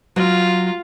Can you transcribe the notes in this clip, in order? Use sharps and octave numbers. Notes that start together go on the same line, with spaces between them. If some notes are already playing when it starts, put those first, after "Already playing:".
F#3 F4